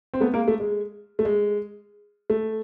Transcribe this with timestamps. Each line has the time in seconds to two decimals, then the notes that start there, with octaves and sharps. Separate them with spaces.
0.14 C4
0.21 A3 B3
0.34 G#3 A#3
0.48 A3
0.60 G#3
1.19 A3
1.25 G#3
2.30 A3